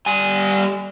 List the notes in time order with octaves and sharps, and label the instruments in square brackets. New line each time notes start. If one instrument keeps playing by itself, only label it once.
[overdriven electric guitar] G3 G#5